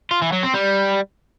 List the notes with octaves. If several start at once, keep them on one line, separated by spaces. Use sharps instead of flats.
F4
E3
F#3
C4
G3